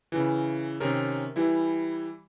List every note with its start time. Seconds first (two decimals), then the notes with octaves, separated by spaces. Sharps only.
0.12 C#3 E3
0.80 C3 D#3 C#4 A#4
1.36 E3 G3 E4